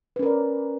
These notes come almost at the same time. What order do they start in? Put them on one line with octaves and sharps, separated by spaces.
B4 C#4 A#4 D5